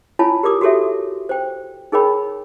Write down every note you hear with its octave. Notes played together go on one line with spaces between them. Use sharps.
E4 F4 C#5 G#5 A5 B5
G4 A#4 D5 D6 D#6
F#4 G4 A4 C#5 E5
C5 G5
D#4 G#4 A#4 C#5 G5 B5